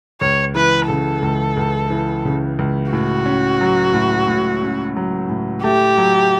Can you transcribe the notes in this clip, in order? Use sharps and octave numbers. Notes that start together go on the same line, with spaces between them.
C#2 C#5
E3 B4
C#3 A4
C#2
C#2
E3
C#3
C#2
A2 F#4
C#4
F#3
A2
A2
C#4
F#3
A2
A3 G4
F#3